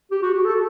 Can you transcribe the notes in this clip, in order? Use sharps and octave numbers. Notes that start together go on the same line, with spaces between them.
G4
F#4
G4
A4